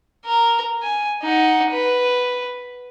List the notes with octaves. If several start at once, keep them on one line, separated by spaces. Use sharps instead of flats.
A#4
G#5
D#4 F#5
B4